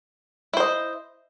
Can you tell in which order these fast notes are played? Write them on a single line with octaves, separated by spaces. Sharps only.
E4 C5 D#5